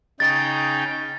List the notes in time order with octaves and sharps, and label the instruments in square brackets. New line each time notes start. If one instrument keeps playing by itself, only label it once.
[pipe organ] C#3 D#4 G5 [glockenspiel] A6